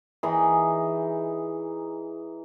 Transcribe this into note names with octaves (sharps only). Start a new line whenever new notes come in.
E3 D#4 G#4